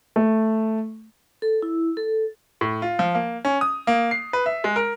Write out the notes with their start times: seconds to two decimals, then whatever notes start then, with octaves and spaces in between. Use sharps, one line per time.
0.16 A3
1.42 A4
1.62 E4
1.97 A4
2.61 A2
2.82 F4
2.99 F3
3.15 A#3
3.45 C#4
3.61 D#6
3.87 A#3
4.11 C7
4.33 B4
4.46 E5
4.64 G#3
4.76 A#4